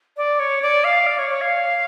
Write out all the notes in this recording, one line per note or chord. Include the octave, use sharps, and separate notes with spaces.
D5
C#5
D5
F5
D5
C#5
C#5
F5